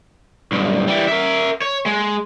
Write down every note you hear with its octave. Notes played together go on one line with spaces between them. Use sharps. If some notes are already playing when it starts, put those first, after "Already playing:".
B1 G2
E3 G3
A#4 E5
C#5
G#3